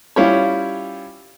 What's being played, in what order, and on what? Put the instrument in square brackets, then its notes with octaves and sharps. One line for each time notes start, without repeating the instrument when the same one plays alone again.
[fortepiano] G3 C#4 E4 F4 G4 C#5